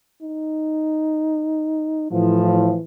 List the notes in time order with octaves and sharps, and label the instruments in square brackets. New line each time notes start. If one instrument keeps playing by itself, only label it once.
[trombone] D#4
[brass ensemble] A2 F3 [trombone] E3